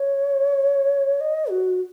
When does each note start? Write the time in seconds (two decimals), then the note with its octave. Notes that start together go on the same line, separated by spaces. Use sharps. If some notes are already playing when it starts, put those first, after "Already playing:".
Already playing: C#5
1.21 D#5
1.50 F#4